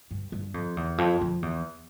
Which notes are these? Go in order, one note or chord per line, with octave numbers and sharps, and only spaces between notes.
G2
G2
F2
E2
F2
F2
E2